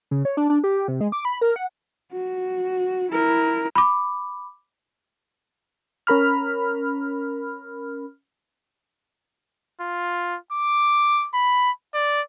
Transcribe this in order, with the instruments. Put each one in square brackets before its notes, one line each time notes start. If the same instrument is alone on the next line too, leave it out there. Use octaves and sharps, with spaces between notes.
[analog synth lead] C#3
C#5
D4
D4
G4
C3
G#3
D6
B5
A#4
F#5
[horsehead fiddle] F#4
E4 A#4
[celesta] B5 D6
[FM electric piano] C#4 A#4 B5 F6
[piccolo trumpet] F4
D6
B5
D5